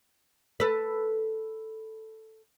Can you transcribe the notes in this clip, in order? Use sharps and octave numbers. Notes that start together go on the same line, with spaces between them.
A4 B4